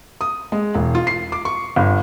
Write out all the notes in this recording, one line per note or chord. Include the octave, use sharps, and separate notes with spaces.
D#6
G#3
E1
F4
C7
D6
C#6
G1